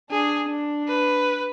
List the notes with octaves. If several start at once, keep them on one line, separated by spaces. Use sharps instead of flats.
D4 G#4
D4
B4